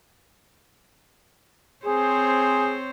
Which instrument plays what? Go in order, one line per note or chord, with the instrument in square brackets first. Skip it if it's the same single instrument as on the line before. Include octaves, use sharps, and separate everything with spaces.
[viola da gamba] C4 C5 C#5 [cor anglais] G#4